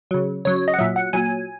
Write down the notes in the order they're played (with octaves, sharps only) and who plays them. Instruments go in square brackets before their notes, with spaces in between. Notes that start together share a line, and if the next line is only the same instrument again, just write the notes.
[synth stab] C#3 F#3
C#3 F#3 C#5
C#5
D#5
F#5
A#2 F#3 E5
F#5
A#2 F#3 G#5